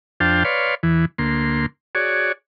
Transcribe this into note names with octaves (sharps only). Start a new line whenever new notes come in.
F2 D4 C5 F5 G5 A5
B4 C#5 D5 F5 C6
E2 E3
D2 A#3 C6
F#4 G#4 C#5 D5